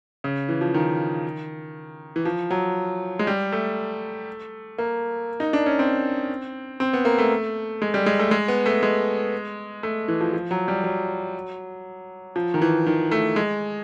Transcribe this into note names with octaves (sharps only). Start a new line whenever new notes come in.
C#3
E3
F3
D#3
E3
F3
F#3
G#3
G3
A3
A#3
D#4
D4
C#4
C4
C4
B3
A#3
A3
G#3
G3
G#3
A3
G#3
B3
A3
G#3
A3
E3
F3
F3
F#3
G3
F#3
F3
D#3
E3
D#3
A3
G#3